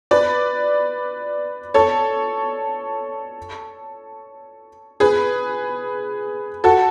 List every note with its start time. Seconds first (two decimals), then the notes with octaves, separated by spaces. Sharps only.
0.11 B4 D5
1.74 A4 C#5
5.00 G#4 B4
6.64 F#4 A4